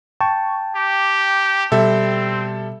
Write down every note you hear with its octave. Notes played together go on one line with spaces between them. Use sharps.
G5 A5 C#6
G4 D6
B2 G3 C4 A4 E5